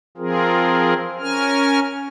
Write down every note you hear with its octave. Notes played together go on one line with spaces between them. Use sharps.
F3 C4 F4 G#4 A#4
C#4 A#4 G#5 F6